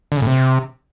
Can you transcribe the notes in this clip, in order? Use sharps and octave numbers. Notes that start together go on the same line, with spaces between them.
D3
C#3
A2
C3